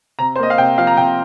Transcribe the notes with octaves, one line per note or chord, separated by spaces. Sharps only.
C3 A#5
C5
A#3 D#5
F5
C3 G5
F3 F5
A#5
C3 G5